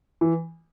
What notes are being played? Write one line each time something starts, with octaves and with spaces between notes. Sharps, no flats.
E3